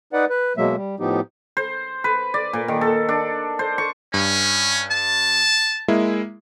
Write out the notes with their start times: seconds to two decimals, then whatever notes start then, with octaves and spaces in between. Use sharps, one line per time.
0.13 D#4 B4 D5 F#5
0.30 B4
0.57 B2 F#3 G#3 A#3 E5
0.76 G3
1.00 A2 F3 B3 D#4 G4
1.57 C5
2.04 B4
2.34 D5
2.53 A#2
2.68 D#3
2.81 A4
3.09 D4
3.59 C5
3.78 C#6
4.14 G2 C#4
4.91 A5
5.88 G#3 A#3 E4